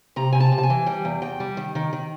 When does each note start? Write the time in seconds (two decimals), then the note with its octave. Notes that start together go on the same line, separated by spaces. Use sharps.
0.16 C3 A#5
0.33 C3 G#5
0.40 A5
0.52 C3
0.58 A5
0.63 G#5
0.70 E3
0.86 G3 G5
1.05 E2
1.22 E2 G5
1.40 G3
1.57 D#3
1.75 D#3
1.93 D#3